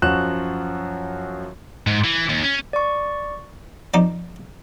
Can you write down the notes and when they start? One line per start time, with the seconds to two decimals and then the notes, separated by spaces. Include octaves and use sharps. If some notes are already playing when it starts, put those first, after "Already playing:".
0.02 F#2 F3 F#3 F#4 F#6 E7
1.87 G#2
2.04 E3
2.29 D#2
2.43 C#4
2.73 D5 C#6
3.94 F2 D#4 D5